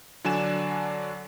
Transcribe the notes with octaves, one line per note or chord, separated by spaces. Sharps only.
D3 F#3 D4 D5 G#5 E7